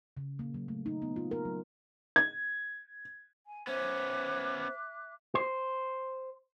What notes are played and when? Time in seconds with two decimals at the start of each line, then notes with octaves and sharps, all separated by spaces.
0.17 C#3
0.39 A#3
0.54 F#3
0.68 A3
0.86 D#4
1.02 B3
1.16 F4
1.31 A#4
1.45 F#3
2.16 G#6
3.45 G#5
3.67 B3 C#4 C5 E5 D6 F#6
5.35 C5